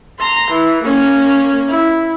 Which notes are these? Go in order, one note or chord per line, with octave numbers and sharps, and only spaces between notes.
A#5 C6
E3
A#3 C#4
E4